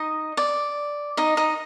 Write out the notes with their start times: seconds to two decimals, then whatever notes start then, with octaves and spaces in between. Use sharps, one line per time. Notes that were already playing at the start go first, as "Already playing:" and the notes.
Already playing: D#4 D#5
0.37 D5
1.17 D#4 D#5
1.37 D#4 D#5